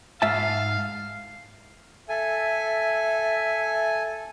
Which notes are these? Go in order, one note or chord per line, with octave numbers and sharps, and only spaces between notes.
G#2 E5 F5 A5
A4 E5 G#5